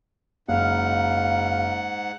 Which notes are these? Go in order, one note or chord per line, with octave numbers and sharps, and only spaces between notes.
F#1 G#2 F5 F#5